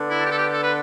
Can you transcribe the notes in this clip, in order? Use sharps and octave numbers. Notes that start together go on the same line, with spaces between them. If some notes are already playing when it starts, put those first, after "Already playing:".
Already playing: D3 B3 D4
E4
A4
G4
A4
G4
A4
B4